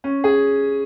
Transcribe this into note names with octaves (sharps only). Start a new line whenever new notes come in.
C#4
G#4